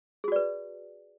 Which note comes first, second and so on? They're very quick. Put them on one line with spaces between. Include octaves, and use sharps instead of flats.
G#4 F#4 D5 B4